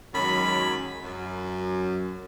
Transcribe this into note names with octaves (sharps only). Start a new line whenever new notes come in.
F#2 D#3 F#3 G#3 B5
F#2